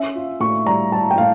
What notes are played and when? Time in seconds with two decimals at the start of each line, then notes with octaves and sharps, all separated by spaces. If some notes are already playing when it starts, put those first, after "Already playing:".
Already playing: C#4 E5
0.15 F4
0.40 A2 C#6
0.66 G3 A#5
0.92 G3 A5
1.11 G5
1.18 A2 F5